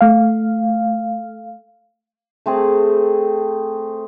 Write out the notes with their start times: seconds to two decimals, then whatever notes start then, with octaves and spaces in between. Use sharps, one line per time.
0.01 A3 F5
2.46 A3 C4 G#4 A5